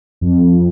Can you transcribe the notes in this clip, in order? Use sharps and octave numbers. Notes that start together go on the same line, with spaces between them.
F2